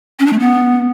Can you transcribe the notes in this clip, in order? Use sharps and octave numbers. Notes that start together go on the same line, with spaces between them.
C#4
D4
A3
B3